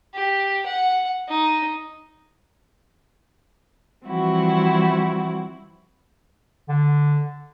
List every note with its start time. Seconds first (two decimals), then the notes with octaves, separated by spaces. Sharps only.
0.14 G4
0.66 F#5
1.28 D#4
4.05 E3 F3 G3 C4 E4 F#4
6.69 D3